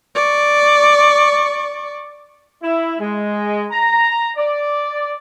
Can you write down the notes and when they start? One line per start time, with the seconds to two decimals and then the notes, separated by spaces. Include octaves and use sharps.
0.15 D5 C#6
2.62 E4
2.99 G#3
3.71 A#5
4.37 D5